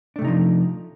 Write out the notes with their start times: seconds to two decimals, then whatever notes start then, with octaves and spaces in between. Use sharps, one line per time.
0.16 D4
0.19 A3
0.22 C3
0.25 D#4
0.27 F3